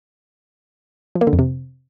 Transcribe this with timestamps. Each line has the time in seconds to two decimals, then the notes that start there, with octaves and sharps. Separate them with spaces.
1.15 F3
1.21 A#3
1.27 D3
1.33 F2
1.39 C3